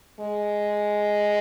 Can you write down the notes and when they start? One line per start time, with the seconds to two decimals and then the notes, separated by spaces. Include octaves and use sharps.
0.20 G#3